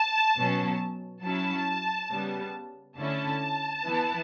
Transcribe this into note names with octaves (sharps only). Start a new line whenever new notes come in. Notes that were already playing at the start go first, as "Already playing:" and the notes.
Already playing: A5
B2 F#3 C#4
F#3 C#4 E4 A5
C#3 G3 B3
D3 A3 C#4 E4 A5
E3 B3 E4